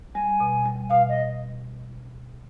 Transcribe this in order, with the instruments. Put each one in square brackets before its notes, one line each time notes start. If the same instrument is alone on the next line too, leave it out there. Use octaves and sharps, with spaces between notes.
[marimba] G3 [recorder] G#5
[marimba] B2
G3
[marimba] B2 [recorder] F5
[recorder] D#5